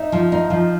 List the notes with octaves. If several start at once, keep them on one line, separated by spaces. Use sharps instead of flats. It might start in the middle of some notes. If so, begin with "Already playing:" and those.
Already playing: D#4 E5
F3
D#4
F3